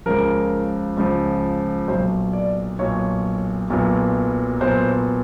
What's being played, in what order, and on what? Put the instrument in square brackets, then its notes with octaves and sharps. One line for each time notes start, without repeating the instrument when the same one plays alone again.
[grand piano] C#2 C#3 F3 A#4
C#2 C#3 F3
B1 A#2 F#3 C5
D5
B1 A#2 F#3 C#5
B1 A#2 F#3 B3
B1 A#2 F#3 B3 C5